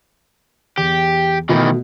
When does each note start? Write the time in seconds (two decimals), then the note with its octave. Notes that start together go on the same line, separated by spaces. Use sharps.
0.77 E2 G4
1.49 B2 D#3 E3 A3